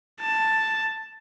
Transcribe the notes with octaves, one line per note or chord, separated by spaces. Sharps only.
A5